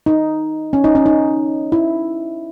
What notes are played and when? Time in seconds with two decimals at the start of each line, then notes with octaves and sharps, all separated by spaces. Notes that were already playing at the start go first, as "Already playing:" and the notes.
0.06 D#4
0.73 C#4
0.84 D#4
0.95 C#4
1.06 D#4
1.72 E4